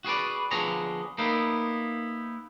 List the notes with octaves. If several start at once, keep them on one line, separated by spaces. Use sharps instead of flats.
F#4 G#4 B4 D5
D3 F3 B3 G#4 C#5 A#5
A#3 B3 D#4 E4